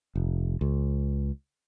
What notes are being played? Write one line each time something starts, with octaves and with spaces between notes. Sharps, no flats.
F1
C#2